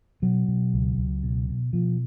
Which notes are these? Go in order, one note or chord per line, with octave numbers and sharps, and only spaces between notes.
B2 F#3
B2
C#2
C#2
B2
B2
B2 F3